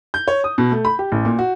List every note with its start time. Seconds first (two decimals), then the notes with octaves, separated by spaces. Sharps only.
0.14 G6
0.28 C#5
0.44 D#6
0.58 B2
0.72 A3
0.85 B5
0.99 G4
1.12 A1
1.25 A#2
1.39 F#4